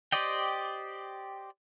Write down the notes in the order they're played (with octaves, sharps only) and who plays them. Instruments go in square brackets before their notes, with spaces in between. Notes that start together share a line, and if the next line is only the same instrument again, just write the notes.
[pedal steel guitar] G4 C5 D5 D#5 G5